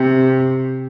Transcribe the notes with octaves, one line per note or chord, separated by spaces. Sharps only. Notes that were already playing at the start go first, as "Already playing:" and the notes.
Already playing: C3